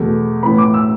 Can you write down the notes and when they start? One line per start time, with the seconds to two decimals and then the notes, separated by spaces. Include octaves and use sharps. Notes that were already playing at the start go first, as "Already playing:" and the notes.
Already playing: E2 B2 A3
0.43 A2 E3 B3 B5
0.58 D6
0.74 E6